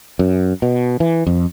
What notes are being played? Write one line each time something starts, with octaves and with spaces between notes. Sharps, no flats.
F#2
B2
E3
F2